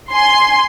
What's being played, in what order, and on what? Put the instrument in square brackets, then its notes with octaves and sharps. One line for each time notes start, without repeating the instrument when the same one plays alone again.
[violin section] G#5 C6